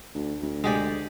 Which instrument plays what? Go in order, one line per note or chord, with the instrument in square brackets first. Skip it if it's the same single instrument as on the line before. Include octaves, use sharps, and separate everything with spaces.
[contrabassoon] D2
D2
[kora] G#3 G4 D5